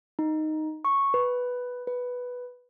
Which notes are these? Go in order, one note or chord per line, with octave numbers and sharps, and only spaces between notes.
D#4
C#6
B4
B4